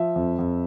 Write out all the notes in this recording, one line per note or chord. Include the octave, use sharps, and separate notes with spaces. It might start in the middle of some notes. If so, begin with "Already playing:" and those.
Already playing: F3 E5
F2
F2